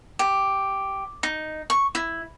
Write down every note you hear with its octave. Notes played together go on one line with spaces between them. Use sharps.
G4
D#4
C#6
E4